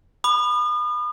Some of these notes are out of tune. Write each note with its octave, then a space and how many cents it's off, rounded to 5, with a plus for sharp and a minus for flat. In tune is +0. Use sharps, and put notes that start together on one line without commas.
B5 +10 D#6 -40